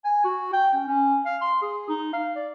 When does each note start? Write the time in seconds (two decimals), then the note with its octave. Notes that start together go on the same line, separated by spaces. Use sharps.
0.05 G#5
0.24 F#4
0.53 G5
0.74 C#4
0.88 C#4
1.26 F5
1.42 C6
1.62 G#4
1.89 D#4
2.13 F5
2.36 D5